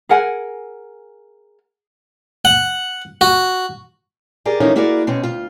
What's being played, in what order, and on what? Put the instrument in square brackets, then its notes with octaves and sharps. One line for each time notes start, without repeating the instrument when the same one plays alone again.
[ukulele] G#4 A#4 F#5 G#5
[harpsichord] F#5
F#4
[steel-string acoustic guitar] G4 G#4 A#4 D5
E3 F3 A3 C#4 D#4 A#4
A#3 E4 F#4 G#4 A#4 D5
B2 C4 C#4
D2 F4